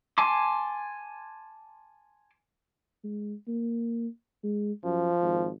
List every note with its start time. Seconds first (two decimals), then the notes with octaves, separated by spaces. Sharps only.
0.18 G#5 A5 C6 D6
3.04 G#3
3.47 A#3
4.43 G#3
4.84 F#2 F3
5.21 G#1